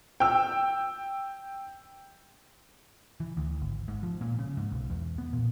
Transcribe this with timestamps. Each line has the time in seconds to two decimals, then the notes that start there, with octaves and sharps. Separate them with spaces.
0.20 G5 E6
3.20 E3
3.37 D2
3.61 G#1
3.88 G#2
4.03 F3
4.21 A#2
4.39 C#3
4.57 G#2
4.72 B1
4.90 E2
5.18 B3
5.33 A#2